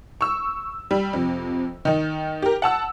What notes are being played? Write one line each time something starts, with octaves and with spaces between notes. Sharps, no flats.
C#6 E6
G3
F2 C3
D#3 D#4
G4 A#4
F#5 A5 E6